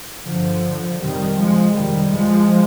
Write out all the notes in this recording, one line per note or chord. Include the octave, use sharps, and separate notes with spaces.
G2 D3 F3
F2 C3 D#3 G3
F3 G#3
F2 C3 D#3 G3
F3 G#3